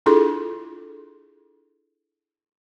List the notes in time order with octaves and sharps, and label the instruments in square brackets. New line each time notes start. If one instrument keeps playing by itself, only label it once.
[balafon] D4 E4 F4 G#4 A4 C6